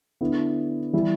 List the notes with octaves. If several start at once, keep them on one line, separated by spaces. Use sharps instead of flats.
D3 B3 E4
E3 G3 E4